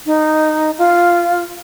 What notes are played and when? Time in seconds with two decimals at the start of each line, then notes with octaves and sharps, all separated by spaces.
0.06 D#4
0.78 F4